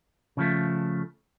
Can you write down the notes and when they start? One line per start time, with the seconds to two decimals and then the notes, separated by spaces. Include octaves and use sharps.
0.37 C#3 F3 A3